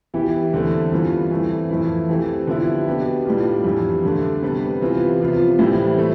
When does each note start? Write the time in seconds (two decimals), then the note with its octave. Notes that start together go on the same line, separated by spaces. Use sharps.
0.14 E3 B3 E4 G4
0.53 E2 D3 A3 C4
0.92 G2 E3 B3 F4
1.31 E3 A3 C4 E4
1.70 F2 E3 A3 E4
2.09 E3 A3 C4 G4
2.47 D3 F3 B3 E4 G4
2.87 B2 B3 D4 G4
3.25 A2 G3 D4 F4
3.64 F2 E3 G3
4.04 G2 D3 A3 D4
4.42 C3 G3 B3
4.81 C3 E3 B3 F4
5.20 C3 F3 B3 F4
5.59 A2 E3 G3 C4 E4
5.98 F3 A3